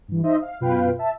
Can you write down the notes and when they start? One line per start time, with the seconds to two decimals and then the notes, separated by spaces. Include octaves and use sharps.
0.08 G2 E3
0.23 D#4 C5 D#5 E5
0.42 F5
0.60 F#2 B2 F4 B4 F5 G5
0.99 E5 A5